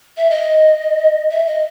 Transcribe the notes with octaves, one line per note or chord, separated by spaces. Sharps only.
E5
D#5
E5
D#5